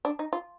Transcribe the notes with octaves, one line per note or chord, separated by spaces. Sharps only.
D4
D#4
F4